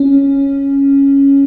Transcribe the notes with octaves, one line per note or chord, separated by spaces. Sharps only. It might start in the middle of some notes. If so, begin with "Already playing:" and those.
Already playing: C#4